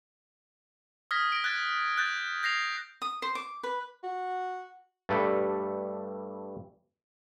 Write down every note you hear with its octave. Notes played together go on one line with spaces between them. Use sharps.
D#6 F6 G#6 A#6 B6
A#6 D7
F#6 G#6 A6
F#6 G6 A6
G6 A#6 C7 F7
D#6
C5
D6
B4
F#4
G2 G3 A3 A4 B4 D5